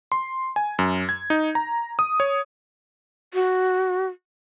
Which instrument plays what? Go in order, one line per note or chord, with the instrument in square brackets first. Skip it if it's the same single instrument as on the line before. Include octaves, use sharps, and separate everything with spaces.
[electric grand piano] C6
G#5
F#2
G#6
D#4
A#5
D#6
C#5
[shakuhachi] F#4